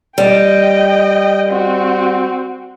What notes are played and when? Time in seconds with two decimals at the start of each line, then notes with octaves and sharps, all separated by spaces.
0.18 G3 D#5 G5
1.48 C4 F#4